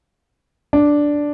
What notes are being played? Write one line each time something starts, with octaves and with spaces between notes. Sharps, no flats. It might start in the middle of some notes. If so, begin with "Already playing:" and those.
D4